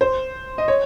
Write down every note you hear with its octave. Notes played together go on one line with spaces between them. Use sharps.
C5
D#5
C#5